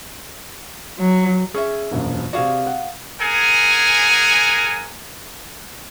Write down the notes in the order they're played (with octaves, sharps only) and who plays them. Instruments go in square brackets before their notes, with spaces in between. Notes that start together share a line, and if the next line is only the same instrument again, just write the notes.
[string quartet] F#3
[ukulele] C#4 E5 [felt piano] G#4
[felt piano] E1 A#1 F#2
[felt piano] C3 D5 [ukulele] F#4 G#4 F5
[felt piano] F#5
[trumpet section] G#4 A#4 F#5 G#5